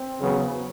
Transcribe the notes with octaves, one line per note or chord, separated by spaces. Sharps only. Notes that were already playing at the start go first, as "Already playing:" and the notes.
Already playing: C4
E2 C#3 F#3 B3